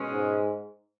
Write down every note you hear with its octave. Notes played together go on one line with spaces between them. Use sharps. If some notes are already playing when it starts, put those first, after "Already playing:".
Already playing: B2 G#3 C#4
G#2